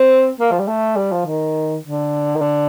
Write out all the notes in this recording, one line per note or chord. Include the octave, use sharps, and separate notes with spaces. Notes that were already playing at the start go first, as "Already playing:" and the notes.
Already playing: C4
A#3
F3
G3
A3
G3
F3
D#3
D3
D#3
D3